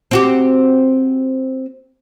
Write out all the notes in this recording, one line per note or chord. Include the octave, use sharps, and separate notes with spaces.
C4 F#4 G4